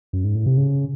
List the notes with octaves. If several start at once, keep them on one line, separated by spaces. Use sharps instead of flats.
F#2
G#2
A2
C3
C#3